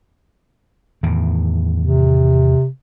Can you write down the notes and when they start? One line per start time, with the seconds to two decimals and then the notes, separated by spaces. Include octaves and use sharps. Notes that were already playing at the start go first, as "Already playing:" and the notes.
1.03 E2 A2 D#3
1.79 C3